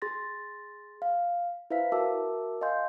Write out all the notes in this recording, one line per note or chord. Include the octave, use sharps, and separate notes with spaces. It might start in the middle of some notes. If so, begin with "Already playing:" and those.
G#4 C6 A6 A#6
F5
E4 B4 C5 E5 F5 B6
F#4 A#4 E5 A5 D6 E6
D#5 F5 G#5 C6 G6